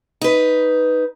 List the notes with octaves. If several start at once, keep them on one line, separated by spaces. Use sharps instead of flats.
D#4 B4